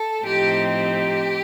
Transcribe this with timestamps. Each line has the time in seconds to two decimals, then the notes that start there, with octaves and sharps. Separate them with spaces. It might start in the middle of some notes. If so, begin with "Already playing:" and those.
Already playing: A4
0.24 A2 F3 C4 D#4 G4
0.71 G4